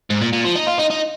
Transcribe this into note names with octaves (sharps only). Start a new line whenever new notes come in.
G#2
A#2
A#2
F3
D#4
F4
D#4
D#4